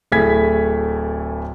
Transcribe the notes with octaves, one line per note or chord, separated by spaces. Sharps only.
D1 A3 E4 G#4 G#6 B6